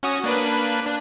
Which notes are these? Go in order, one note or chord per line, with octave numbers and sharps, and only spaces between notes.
C#4 F#4 D#6
A#3 D4 B4
D4